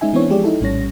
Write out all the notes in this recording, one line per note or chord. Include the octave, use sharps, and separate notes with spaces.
G#3 C#4 D#4 E5 G#5
E3 B3 C4 D4 E4 C#5
F3 G#3 G4 G#4 D5
D#4 E4 A4
A#1 A2 G3 C#4 C#5 A#6